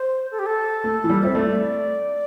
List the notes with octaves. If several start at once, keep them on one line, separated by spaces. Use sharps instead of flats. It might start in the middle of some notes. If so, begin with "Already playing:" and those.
Already playing: C5
A4
G4
A4
A3
E3
G3
C4 E5
A3 D5